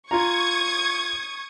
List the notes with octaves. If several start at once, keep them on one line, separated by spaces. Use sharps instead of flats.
F4 A#5 C#6 D#6 G#6